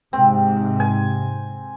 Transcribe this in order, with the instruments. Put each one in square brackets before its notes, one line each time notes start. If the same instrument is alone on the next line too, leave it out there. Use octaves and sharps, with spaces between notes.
[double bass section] G#2 C3 [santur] C4
[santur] G#5